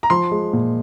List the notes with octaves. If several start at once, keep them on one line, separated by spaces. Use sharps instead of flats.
A#5
F3 C6
G#3
A#2